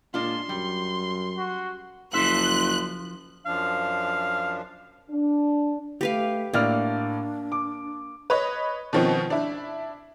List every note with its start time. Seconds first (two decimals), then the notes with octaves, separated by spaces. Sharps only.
0.14 A#2 G#3 D4 F4 C6
0.49 F#2 G3
1.37 F#4
2.13 F#1 F3 E5 C6 F#6
3.46 F#2 F3 D4 F5
5.10 D4
6.01 A3 G4 B4 F5
6.54 A2 A#3 D4 D5 F6
7.52 D6
8.30 B4 C#5 D#5
8.93 B2 D#3 F3 C4 C#4
9.30 D4 E4